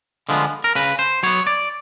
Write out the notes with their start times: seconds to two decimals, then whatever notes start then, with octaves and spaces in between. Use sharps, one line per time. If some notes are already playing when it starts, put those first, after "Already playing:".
0.29 D3 F3 G#3 B3
0.64 A#4
0.75 C#3 B4
0.99 C5
1.23 F#3 B3 C#5
1.47 D5